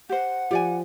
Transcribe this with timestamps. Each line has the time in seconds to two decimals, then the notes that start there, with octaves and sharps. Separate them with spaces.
0.09 G4 C5 F#5
0.51 F3 G4 D5 G#5